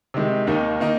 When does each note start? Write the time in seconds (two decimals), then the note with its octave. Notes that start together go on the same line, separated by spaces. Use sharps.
0.14 C3 D#3 G#3
0.47 D#2 D#3 A#3 D#4
0.80 D#3 A#3 D#4